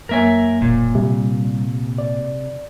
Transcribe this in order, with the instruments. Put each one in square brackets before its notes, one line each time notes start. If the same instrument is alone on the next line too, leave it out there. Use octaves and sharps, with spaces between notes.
[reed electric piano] F#2 A#3 C#5 [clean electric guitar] A#4 E5 G#5
[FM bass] E1 [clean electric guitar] A#2
[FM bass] C3 [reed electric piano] G3
[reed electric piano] D5